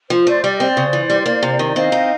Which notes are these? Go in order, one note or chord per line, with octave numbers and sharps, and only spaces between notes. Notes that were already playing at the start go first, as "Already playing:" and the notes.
F3 C5
A3 C5 D5
G3 D5
D#5
C4
C5 D5
C#3
E3
G3
A#3
C3
D#3
C4 D#5 F5
D#4